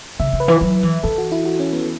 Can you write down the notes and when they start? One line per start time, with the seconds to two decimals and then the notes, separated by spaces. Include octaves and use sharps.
0.20 C#3 E5
0.33 C#3
0.40 B4
0.48 E3
0.61 F#3
0.83 E3
1.03 E3 A4
1.18 F#4
1.32 E4
1.45 F#4
1.59 C#4
1.73 B3